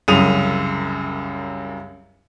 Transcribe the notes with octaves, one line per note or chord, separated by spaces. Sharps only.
C2 F#2 C#3 D#6 D#7 F7